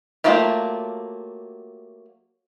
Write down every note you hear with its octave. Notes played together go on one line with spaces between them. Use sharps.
F#3 A3 A#3 F4 G4